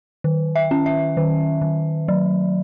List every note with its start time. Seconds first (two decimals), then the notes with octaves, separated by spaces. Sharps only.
0.24 D#3
0.56 E5
0.71 C#4
0.86 E5
1.17 D#3
1.61 D#3
2.08 F#3